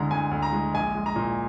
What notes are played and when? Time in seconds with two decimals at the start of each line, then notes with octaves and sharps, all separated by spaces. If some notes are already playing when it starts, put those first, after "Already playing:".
Already playing: D2 D3 G#3 A#5
0.11 D2 G#5
0.31 D2
0.42 A#5
0.53 G#3
0.74 A#1 G#5
0.95 G#3
1.06 A#5
1.16 A#2